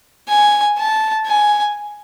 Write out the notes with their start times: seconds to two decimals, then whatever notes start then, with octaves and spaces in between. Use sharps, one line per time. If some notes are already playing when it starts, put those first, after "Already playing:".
0.29 G#5
0.79 A5
1.27 G#5